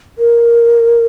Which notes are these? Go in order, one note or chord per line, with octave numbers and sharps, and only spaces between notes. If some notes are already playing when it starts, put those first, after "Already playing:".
A#4